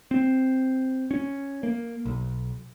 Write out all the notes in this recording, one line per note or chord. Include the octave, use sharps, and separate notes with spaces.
C4
C#4
A#3
B1